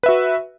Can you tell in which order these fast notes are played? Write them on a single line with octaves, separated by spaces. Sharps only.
B4 E5 F#4